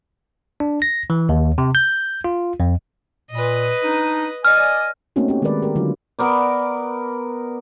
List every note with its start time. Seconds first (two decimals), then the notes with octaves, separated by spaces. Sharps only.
0.60 D4
0.82 A#6
1.10 E3
1.29 D#2
1.58 C3
1.75 G6
2.24 F4
2.60 F2
3.31 A#2 B4 D#5
3.83 D4 D#4
4.45 D5 D#5 G#5 F6
5.16 A3 A#3 C4 C#4 D#4 F#4
5.28 C#4 G4
5.42 D#3 G#3 C#4 A#4 B4 D5
5.63 G4 A#4
5.76 D3 F#3 D4 F4
6.19 B3 A#4 D5